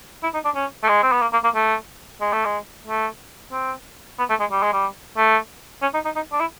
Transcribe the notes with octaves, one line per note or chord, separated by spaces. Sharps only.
E4
D#4
D4
C#4
A3
G#3
C4
B3
A#3
A#3
A#3
A3
G#3
A3
G#3
A3
C4
B3
A3
G#3
G3
G#3
G3
A3
C#4
D#4
D#4
D#4
D4
E4